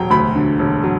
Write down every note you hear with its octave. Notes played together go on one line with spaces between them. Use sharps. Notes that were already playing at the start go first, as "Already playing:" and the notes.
Already playing: E1 F#3 G5 A#5
D2 B5
D3
E1
F#3